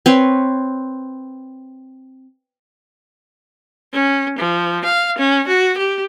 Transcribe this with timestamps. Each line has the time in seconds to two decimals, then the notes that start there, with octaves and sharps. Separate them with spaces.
0.06 C4 B4 C#5 C6
3.93 C#4
4.39 F3
4.85 F5
5.18 C#4
5.48 F#4
5.77 G4